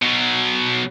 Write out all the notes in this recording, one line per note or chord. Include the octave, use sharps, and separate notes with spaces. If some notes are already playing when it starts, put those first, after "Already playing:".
B2 F#3